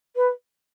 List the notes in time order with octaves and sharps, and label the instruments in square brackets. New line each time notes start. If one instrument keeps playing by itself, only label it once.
[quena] B4